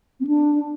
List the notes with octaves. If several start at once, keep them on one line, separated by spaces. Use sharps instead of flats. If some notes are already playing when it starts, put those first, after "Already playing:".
C4
D4